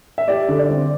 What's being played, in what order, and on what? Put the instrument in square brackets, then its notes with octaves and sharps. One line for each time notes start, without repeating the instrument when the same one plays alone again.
[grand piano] E5
[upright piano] G4 [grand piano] D5
[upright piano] D3
[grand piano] D5
[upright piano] C4